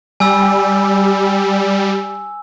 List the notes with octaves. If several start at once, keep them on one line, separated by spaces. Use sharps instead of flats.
G3 G#5 E6